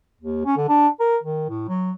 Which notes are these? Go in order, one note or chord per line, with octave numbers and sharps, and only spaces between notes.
D#2
C#4
D3
D4
A#4
D#3
A2
F#3